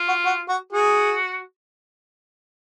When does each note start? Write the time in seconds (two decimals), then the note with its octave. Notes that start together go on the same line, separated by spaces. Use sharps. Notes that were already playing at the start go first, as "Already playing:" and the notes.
Already playing: F4
0.08 F#4
0.25 F#4
0.49 F#4
0.72 F#4 G#4